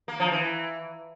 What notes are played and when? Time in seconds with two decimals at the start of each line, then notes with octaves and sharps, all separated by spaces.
0.08 A#3
0.20 F3
0.31 E3